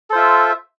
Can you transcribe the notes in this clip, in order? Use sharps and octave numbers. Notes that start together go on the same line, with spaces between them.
F4 A4 C5 E5